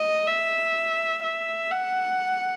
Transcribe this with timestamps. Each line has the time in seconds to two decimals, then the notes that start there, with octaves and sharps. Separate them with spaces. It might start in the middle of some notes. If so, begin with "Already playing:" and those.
Already playing: D#5
0.27 E5
1.23 E5
1.71 F#5